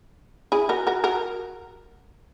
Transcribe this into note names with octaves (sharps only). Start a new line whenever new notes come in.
E4 G#4
F#4 A#4
F#4 A#4
F#4 A#4